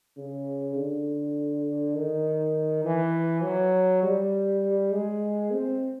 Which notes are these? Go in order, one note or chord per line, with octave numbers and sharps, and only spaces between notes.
C#3
D3
D#3
E3
F#3
G3
G#3
C4